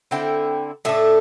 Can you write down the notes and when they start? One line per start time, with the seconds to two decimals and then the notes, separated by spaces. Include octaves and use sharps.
0.11 D3 C4 E4 G5
0.85 A2 A3 D4 E5